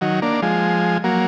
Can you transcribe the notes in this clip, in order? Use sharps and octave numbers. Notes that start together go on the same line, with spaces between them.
D#3 F#3
A#3 D4
F3 G#3
F#3 A#3